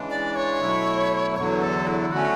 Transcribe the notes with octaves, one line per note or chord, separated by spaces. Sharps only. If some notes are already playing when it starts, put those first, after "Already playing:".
Already playing: C#3 E3 G#3 D4
D5
C#5
B2 F#3 A3 E4
E2 D3 F#3 C#5
A4
E4
D3 F#3 A3 C#4 F#4